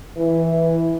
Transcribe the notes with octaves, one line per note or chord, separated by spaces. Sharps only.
E3